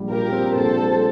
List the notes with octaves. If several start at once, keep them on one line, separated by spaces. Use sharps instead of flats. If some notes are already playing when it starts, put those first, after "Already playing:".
Already playing: A#1 G3
A#2 G4 A#4
C4
A#1 A4 C5
G3